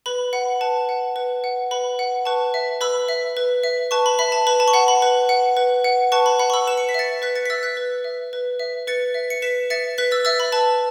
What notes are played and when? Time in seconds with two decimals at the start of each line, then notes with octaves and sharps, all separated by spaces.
0.06 B4 B5
0.33 F#5 B5
0.61 B4 A5
0.89 F#5
1.16 B4
1.44 F#5
1.71 B4 B5
1.99 F#5
2.25 B4 A5 C#6
2.54 E5
2.81 B4 B5 E6
3.09 E5
3.37 B4
3.64 E5
3.91 B4 A5 C#6
4.06 B5
4.19 E5 B5
4.32 A5
4.47 B4 B5
4.60 A5
4.68 C#6
4.74 F#5 B5
4.88 B5
5.02 B4
5.29 F#5
5.57 B4
5.84 F#5
6.12 B4 A5 C#6
6.26 B5
6.39 F#5 B5
6.50 C#6
6.53 B5 E6
6.67 B4 E7
6.78 C#7
6.89 B6
6.94 E5 A6 C#7
7.22 B4 F#6 B6
7.35 A6 C#7
7.46 B6
7.50 E5 E6 A6
7.63 F#6 B6
7.77 B4
8.04 E5
8.33 B4
8.60 E5
8.87 B4 A6 C#7
9.14 E5
9.30 C#7
9.42 B4 B6 E7
9.70 E5 A6 C#7
9.98 B4 F#6 B6
10.11 E6 A6
10.25 E5 E6 A6
10.40 B5
10.52 B4 A5